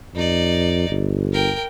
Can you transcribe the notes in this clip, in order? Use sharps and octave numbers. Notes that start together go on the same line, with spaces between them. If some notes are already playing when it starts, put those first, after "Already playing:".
F2 D#4 D5
G1
A#4 G5